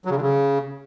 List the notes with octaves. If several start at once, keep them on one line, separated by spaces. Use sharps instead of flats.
F#3
C#3
D3
C#3